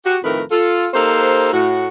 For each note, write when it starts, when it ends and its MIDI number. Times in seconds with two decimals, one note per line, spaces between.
0.05 0.18 66
0.05 0.18 67
0.24 0.42 41
0.24 0.42 45
0.24 0.42 51
0.24 0.42 57
0.24 0.42 70
0.24 0.42 71
0.51 0.88 65
0.51 0.88 69
0.94 1.50 58
0.94 1.50 63
0.94 1.50 67
0.94 1.50 69
0.94 1.50 72
1.53 1.87 45
1.53 1.87 66